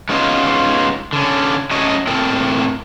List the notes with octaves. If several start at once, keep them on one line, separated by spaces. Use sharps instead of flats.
G#3 B3 C#4 D#4 F4
D3 C#4
F#3 A3 C#4 C#5 D#5
A2 C4 A4 A#4 G5